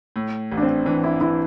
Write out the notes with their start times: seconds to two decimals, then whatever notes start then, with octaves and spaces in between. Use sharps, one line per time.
0.16 A2
0.52 A1
0.58 D4
0.63 C4
0.86 E3 D4
1.04 E4
1.21 E3 E4